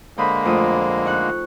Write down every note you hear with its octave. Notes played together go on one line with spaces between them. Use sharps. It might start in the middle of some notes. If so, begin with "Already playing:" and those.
D3 G#3 A#3 C5 B5 D#6
F2 A3 D#6
D#4 C#6 F#6